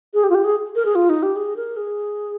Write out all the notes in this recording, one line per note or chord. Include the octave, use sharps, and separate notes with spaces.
G#4
G4
F4
G4
G#4
A#4
G#4
F4
D#4
G4
G#4
A#4
G#4